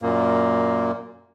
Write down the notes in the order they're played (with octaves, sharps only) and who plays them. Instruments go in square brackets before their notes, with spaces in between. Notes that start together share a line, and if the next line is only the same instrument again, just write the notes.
[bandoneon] F#2 A#2 A#3